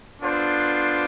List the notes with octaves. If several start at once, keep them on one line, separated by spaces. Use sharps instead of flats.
B3 D4 F4 A4 C5